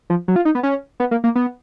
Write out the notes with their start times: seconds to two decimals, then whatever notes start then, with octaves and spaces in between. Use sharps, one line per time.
0.10 F3
0.28 F#3
0.36 F4
0.45 D#4
0.55 B3
0.63 C#4
1.00 B3
1.11 A#3
1.24 A#3
1.35 B3